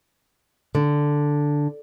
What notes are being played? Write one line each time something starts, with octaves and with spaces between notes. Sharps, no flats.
D3